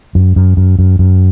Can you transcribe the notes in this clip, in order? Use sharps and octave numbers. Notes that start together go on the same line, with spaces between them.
F#2
F#2
F#2
F#2
F#2